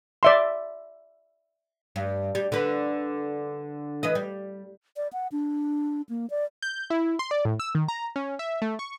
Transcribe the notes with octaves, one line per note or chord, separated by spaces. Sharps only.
D5 E5 C6
G2
G3
D3 B4
E3 B4 D#5
G3
D5
F#5
D4
A#3
D5
G6
E4
C6
D5
A2
E6
D#3
A#5
C#4
E5
A3
C#6